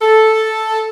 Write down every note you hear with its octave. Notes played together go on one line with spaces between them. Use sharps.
A4